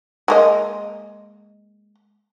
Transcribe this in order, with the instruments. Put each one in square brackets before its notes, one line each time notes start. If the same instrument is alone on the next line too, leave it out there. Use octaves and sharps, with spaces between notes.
[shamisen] G#3 A#3 D#5